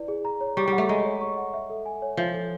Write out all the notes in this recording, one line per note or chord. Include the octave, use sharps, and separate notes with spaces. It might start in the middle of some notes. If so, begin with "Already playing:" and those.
Already playing: E4 B4 D5
G#4
A#5
C#5
G3 C#6
G3
F#5
A3
G#3 A#5
C#5
C#6
F#5
E5
A4
G#5
C#5
F3 E5
A4